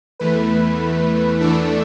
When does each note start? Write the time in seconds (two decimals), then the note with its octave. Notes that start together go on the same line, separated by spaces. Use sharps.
0.20 E2 E3 A3 B4
1.41 E2 E3 A3 D4 A4 D5